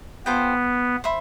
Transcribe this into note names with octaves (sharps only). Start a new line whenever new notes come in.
B3 F4 A4 C5 G5
C5 E5 B5